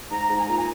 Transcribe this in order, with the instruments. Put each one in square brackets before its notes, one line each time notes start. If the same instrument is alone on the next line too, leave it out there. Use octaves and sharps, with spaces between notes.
[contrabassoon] G#2 [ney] A#5
[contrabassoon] G#2 [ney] A#5
[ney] G#5
[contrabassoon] A#2 [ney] A#5
[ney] G#5